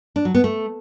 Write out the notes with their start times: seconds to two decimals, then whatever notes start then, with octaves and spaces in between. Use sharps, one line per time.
0.16 D4
0.25 F#3
0.34 B3
0.44 A3